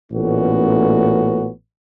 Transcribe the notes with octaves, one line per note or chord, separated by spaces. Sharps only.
A1 A#2 A3 B3 C#4 F#4